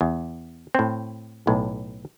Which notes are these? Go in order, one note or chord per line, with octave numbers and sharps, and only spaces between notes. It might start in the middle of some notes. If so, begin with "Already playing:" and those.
E2
A2 C4
B1 A2